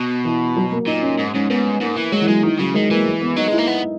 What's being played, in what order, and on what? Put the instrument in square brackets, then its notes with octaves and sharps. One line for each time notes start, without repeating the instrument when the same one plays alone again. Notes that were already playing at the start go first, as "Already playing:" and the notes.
Already playing: [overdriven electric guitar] B2
[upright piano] E3
F#3
A#3
[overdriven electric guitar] A#2 [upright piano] D#4
[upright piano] C#4
[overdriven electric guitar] G#2
[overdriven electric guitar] G#2 [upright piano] C#4
[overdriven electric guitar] G#2 [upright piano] B3
[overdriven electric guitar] G#2 [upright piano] A#3
[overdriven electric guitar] E3
[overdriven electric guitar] F#3 [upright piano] G#3
[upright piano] E3
[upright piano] F#3 [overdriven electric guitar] G#3
[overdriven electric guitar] D#3 [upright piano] E3
[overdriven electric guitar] C#3 [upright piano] F#3
[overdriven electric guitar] D#3 [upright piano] G#3
[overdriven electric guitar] E3 [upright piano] A#3
[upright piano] G#3
B3
[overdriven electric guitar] F#3 [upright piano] D#4
[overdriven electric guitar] G#3 [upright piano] E4
[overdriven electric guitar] A#3
B3